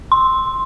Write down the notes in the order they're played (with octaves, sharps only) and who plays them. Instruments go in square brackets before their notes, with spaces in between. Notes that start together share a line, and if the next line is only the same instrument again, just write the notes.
[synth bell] C6